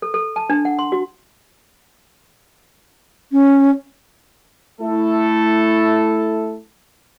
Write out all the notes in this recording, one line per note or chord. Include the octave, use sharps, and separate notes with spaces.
A4
A4
A5
D4
F#5
C6
F#4
C#4
A3 E4 A4